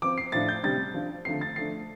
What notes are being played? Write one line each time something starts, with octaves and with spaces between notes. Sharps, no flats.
F3 C4 D6
C7
A2 F3 D4 A6
G6
C3 G3 D4 A6
F3 D4
D3 F3 A3 C4 C7
A6
F3 A3 D4 C7